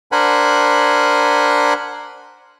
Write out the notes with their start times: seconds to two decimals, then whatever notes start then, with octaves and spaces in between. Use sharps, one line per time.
0.12 D4 A#4 C5 F#5 G#5 B5